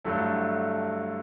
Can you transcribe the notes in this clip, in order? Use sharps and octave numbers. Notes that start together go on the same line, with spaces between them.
G2 D3 F#3 A3 E4